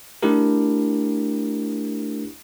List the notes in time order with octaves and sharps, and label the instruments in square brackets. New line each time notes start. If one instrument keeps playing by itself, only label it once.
[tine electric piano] A3 D4 E4 G4 A#4